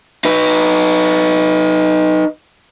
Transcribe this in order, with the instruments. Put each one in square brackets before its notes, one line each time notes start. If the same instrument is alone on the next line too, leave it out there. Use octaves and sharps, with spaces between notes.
[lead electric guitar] D#4 B4